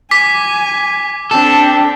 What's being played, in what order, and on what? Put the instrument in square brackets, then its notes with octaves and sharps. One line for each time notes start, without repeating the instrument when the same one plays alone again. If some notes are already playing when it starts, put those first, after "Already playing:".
[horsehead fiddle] G#5 [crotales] D6 B6
[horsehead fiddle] C4 D4 [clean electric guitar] A4